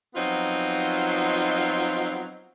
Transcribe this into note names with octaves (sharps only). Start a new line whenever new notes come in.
F3 F#3 B3 C4 D#4 F4